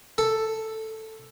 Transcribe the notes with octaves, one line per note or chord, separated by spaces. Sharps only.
A4